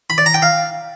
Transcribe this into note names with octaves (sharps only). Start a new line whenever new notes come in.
B5
D5
A#5
G5
F5